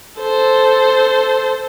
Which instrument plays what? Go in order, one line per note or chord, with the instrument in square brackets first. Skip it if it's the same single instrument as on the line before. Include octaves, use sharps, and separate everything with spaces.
[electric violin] A4 C5